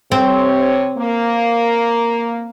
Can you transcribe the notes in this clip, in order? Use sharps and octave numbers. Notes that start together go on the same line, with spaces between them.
C3 C4 C#5
A#3